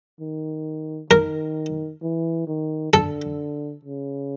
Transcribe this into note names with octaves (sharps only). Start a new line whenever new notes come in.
D#3
D#3 A#4
E3
D#3
D3 A4
C#3